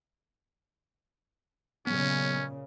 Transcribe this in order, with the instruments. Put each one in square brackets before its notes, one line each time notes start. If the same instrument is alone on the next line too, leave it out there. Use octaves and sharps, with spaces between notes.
[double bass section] A#2 C#3 [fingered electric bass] F#3 B3 [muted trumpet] C#4